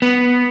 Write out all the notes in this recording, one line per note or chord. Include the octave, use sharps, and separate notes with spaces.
B3